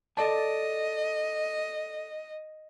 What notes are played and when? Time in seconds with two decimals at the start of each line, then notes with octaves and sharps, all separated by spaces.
0.17 A4 D5 D#5 A5